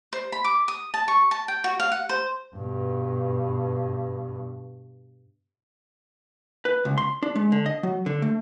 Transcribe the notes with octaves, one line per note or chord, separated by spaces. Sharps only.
C5
B5
D6
D#6
A5
C#6
A5
G5
F#4
F5
F#5
C5
G2 B2
B4
C#2
C6
D4
G#3
D3
D#5
F#3
D3
A3